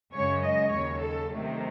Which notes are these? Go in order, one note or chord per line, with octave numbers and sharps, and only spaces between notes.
F#2 C#3 G#3 C#5
D#5
D#2 C#3 F#3 C#5
A4
C3 D#3 F#3 A3